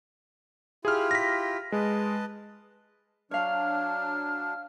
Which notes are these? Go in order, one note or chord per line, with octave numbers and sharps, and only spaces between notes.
E4 F4 G4 G#4 F6
A#6 B6
G#3 B4 D#5 A5
F#3 D4 C#5 F5 F6